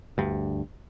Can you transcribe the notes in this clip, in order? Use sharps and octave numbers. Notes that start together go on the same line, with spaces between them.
D2 G2